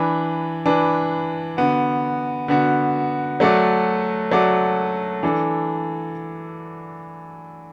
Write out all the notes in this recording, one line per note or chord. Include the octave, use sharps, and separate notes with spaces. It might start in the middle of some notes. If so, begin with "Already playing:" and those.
Already playing: E3 D4 B4
E3 D4 B4
D3 B3 F#4
D3 B3 F#4
F#3 A3 F#4 D5
F#3 A3 F#4 D5
E3 D4 A4